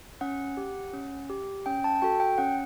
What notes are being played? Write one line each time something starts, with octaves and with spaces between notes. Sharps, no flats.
C#4 F#5
G4
C#4
G4
C#4 G5
A5
F#4 A4 G5
G5
C#4 F#5